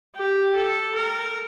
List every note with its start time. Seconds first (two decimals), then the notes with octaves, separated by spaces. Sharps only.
0.15 G4
0.55 A4
0.95 A#4